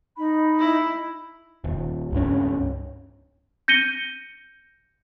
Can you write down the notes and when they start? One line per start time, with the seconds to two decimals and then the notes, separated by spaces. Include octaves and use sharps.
0.17 D#4 B5
0.59 E4
1.64 D#1
2.12 C#2 G2 C#4
3.68 G6 A#6 C#7 D#7 G7